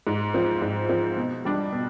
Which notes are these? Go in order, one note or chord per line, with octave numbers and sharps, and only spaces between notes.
G#2
F3 C4
G#2
F3 C4
B2
G3 D4
B2